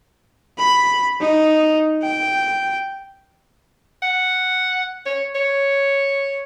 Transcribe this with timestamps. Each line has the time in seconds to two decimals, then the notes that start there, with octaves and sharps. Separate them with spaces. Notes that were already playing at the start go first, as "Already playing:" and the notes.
0.59 B5
1.21 D#4
2.02 G5
4.02 F#5
5.06 C#5
5.35 C#5